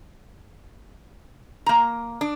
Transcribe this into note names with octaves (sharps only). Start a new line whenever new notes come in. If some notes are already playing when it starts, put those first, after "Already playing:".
A#3 A#5
D4